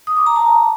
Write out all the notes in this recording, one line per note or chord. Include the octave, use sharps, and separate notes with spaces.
D#6
D6
A#5
A5